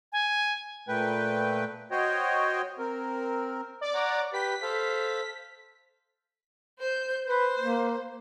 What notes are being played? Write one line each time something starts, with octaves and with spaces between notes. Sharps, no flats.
G#5
A#2 A3 B4 G5
F#4 C5 C#5 D#5 G5
C4 A#4
D5 D6
C#5 F#5 A#5
G4 B4 B6
A4 C5 F5
C5 G6
B4 C5
A#3